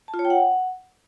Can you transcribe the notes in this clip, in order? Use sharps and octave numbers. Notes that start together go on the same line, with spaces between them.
A5
F4
C#5
G5
F#5